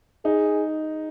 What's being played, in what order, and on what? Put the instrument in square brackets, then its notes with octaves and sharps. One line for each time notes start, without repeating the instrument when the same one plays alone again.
[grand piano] D#4 [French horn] G#4